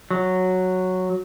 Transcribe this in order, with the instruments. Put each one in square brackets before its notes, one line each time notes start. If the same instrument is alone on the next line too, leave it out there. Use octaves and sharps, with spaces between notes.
[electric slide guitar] F#3